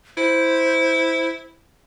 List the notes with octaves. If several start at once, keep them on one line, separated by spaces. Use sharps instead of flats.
E4 C5